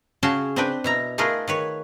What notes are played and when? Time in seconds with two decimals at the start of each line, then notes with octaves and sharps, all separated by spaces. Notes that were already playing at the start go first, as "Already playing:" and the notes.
0.23 C#3 C#4 F#4 G#4 G5 A5
0.56 C4 D4 B4 G5
0.84 B2 E4 A#5
1.18 A3 D#4 F4 G#4 A#4 B4
1.48 D#3 B4 C#5